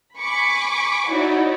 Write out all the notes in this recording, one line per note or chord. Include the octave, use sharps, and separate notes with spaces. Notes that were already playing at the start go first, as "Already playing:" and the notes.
G#5 B5 C#6 D6
D#4 E4 F#4 C#5 D5